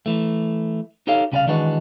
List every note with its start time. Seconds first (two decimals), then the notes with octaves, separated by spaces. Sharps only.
0.06 E3 A3
1.07 D#4 G4 A4 C#5 F5
1.32 C2 C#3 F#4 B4 D5 F5
1.47 D#3 E3 G#3 D4 F#4 B4